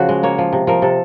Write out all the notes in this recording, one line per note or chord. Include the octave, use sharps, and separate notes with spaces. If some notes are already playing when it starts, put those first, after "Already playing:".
Already playing: C#3 F3 F#4
G#3
A#3 C#5
F3
C3
F3 A#4
C3 A4